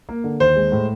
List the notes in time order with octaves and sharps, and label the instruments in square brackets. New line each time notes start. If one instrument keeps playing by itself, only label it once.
[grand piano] A#3
D3
D#2 C5
G#3
A2